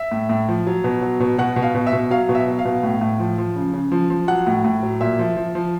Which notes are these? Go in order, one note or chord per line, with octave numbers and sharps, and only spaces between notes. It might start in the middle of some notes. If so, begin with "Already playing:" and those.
Already playing: E5
A2
A2
F3
F#3
B2
F#3
B2
B2 F#5
B2
F5
B2
E5
B2
F#3 F5
B2
E5
F#3
F5
B2
A2
A2
F3
F3
C#3
C#3
F3
F3
F#3 F#5
A2
A2
F#3
A#2 E5
F3
F3
F3